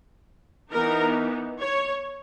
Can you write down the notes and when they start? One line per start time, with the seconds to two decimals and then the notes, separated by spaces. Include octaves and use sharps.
0.71 E3 B3 D#4 A#4
1.59 C#5